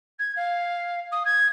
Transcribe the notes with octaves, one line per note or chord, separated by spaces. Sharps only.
G#6
F5
D#6
G#6